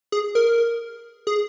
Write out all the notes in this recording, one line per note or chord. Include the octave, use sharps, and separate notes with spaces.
G#4
A#4
G#4